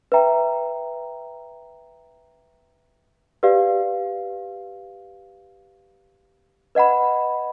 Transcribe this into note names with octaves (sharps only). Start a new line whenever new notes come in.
B4 E5 G5 A#5
G4 B4 D5 F5
B4 D#5 F#5 B5